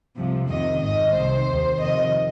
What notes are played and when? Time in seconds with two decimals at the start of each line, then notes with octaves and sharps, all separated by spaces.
0.16 C2 C3 F3
0.48 F2 C3 D#3 D#5
0.81 G#1 G#2 D#3 D#5
1.14 C2 C3 D#3 C5
1.47 D#2 D#3
1.80 F2 C3 D#3 D#5